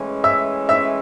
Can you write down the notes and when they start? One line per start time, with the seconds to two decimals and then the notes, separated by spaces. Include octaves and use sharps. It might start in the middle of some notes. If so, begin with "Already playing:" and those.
Already playing: A2 E3 G#3 C#4
0.24 E5 E6
0.69 E5 E6